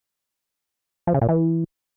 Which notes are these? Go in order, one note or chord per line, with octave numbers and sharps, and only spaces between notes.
F3
C#3
A#2
E3